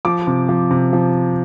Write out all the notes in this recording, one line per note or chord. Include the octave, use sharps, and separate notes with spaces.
F3 D6
C3
F3
C3
F3